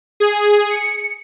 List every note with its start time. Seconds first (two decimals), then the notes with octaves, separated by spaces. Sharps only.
0.20 G#4
0.70 C#7